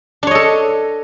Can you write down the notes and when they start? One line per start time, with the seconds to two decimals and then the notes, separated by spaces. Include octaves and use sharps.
0.23 D4
0.27 C#5
0.31 D#5
0.35 A4